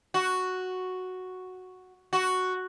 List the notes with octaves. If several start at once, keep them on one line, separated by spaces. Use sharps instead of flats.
F#4
F#4